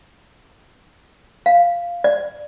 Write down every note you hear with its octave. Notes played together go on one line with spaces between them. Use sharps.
F5
D5